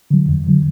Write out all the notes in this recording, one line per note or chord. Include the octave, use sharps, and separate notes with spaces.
D3 F#3
F2
D3 F#3